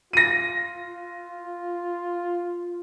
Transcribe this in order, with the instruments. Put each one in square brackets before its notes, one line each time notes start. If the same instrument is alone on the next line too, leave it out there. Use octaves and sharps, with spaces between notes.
[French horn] F4 [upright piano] A#6 D#7